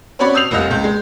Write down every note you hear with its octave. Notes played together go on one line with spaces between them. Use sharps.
C4 C#4 F#4 C#5 D5 B5
D#6 E6 G6 C7 F7
F1 C2 F4 D#5 F#5 E6
C#2 G6
G#3